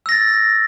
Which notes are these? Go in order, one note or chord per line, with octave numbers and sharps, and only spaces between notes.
E6 A6 A#6